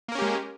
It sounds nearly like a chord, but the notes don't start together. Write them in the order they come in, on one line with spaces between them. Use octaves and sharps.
A#3 A#4 C#4 G4 G#3